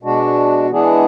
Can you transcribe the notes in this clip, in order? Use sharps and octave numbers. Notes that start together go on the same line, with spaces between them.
B2 G#3 D4 F#4
E3 G#3 B3 D4 G#4